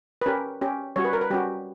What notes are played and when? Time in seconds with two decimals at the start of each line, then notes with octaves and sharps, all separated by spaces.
0.22 B4
0.26 C#4 G4 A#4
0.61 C#4 G4
0.96 G3 C#4 F#4 C#5
1.05 B4
1.13 A#4
1.21 B4
1.30 G3 C#4 F#4 G4